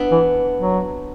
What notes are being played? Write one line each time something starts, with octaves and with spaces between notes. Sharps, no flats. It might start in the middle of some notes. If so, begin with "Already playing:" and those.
Already playing: B3 D4 E4
E3
F#3